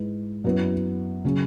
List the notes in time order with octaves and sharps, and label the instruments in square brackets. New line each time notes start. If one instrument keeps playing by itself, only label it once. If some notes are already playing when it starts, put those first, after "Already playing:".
Already playing: [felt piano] G#2 G#3 E4 B4
F#2 F#3 B3 E4 B4
C#3 F#3 C#4